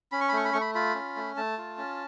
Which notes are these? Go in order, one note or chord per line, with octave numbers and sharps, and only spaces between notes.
C#4 B5
C#6
B5
A3 C#6
B5
A3 C#6
B5
F4 B5
C#4
A3
A3 A5
F4
C#4